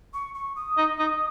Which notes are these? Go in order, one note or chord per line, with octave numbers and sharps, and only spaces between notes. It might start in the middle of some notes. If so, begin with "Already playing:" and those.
C#6
C#6
D#6
D#4
D#4